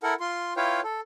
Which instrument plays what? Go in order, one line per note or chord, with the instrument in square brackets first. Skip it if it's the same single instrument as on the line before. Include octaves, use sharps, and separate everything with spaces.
[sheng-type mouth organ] E4 A4 A#4 F#5
F4 C6
E4 F4 B4 C#5 F5 G5
A4